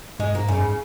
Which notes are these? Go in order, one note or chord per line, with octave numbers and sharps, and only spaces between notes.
G#2 G#3
G#2 A#3
F#2 C#3
G#2